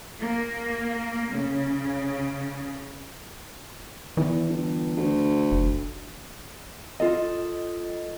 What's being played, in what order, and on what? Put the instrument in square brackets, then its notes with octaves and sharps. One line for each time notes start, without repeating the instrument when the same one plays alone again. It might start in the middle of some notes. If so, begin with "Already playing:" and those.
[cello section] A#3
C#3
[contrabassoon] E2 [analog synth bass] E3
[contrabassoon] G1
D2
[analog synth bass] F#1
[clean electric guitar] F4 A4 D#5